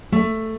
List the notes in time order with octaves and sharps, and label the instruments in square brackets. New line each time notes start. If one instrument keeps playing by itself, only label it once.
[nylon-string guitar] A3